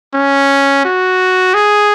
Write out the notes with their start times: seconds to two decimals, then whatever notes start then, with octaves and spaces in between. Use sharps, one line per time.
0.14 C#4
0.85 F#4
1.54 G#4